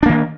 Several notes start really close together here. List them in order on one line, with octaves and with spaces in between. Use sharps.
D4 A#3 D#3